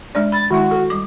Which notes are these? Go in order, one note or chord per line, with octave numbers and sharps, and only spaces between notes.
G#3 D4 D5
B5 A6
D#3 G#3 E4 F#4
A4
G3 D6